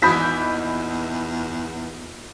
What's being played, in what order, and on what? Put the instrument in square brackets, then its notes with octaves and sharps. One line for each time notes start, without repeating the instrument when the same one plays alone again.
[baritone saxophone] E2 [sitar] A#2 D#3 E3 [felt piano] B5 G6 B6